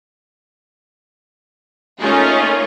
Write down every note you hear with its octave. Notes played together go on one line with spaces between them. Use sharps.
A3 A#3 C#4 D#4 F4 G#4